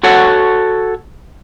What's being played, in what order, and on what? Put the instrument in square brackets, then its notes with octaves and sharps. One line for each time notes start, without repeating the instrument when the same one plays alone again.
[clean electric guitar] F#4 A4 C#5 F#5